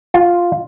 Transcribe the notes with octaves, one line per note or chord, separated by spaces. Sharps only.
F4